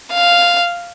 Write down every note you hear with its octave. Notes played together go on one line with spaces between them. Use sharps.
F5